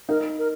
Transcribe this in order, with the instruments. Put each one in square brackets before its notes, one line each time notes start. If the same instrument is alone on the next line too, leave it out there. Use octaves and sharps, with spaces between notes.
[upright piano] D#4 [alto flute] A#4
[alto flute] A#4